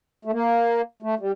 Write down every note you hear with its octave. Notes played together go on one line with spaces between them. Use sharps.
A3
A#3
A3
G3